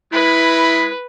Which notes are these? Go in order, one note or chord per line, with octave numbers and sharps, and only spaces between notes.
G#3 E4 B4 B5